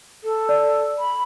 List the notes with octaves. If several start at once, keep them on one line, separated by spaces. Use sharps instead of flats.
A4
D5
B5